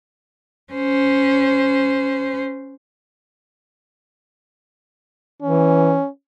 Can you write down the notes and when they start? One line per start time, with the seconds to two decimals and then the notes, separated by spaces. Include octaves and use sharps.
0.73 C#4 C5
5.42 E3 C#4